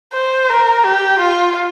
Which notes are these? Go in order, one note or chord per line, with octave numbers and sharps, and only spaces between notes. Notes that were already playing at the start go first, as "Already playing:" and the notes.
C5
A#4
G4
F4